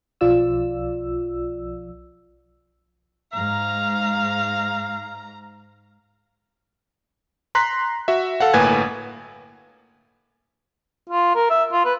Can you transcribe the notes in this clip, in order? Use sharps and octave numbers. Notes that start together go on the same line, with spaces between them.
B1 F3 F4 D5 E6
G#2 F5 A#5
A#5 C6 F#6 B6
F#4 E5
A4 F5 F#5
G1 A2 A#3 B4 G#5 G#6
F4
A#4
E5
F4
B4